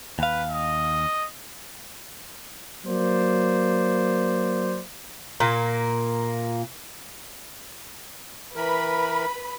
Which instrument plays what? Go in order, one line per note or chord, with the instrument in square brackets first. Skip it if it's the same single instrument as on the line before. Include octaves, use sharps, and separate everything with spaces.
[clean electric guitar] D#2 F5 [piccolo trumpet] B4
[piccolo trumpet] D#5
[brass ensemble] F#3 A#3 C5 D5
[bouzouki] A#2 A#3
[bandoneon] E3 A#4 [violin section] B4 B5